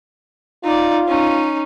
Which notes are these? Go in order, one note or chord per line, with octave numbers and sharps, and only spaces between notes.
D#4 F4 D5
C#4 D#4